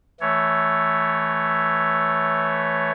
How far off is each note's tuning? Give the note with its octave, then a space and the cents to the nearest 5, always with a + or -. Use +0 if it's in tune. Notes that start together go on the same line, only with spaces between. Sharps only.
E3 +0 A3 +0 C#5 +5